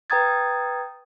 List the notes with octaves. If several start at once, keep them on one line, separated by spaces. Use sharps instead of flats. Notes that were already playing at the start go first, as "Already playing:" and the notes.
B4 G5 A#5 D#6 G#6 A6